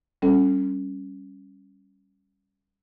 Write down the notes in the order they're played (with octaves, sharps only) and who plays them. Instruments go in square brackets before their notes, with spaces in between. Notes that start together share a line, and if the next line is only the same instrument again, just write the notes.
[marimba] G3 C#4 A4